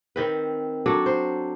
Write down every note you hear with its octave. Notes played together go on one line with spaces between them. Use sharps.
D#3 C4 B4
F#3 D4 A4
C5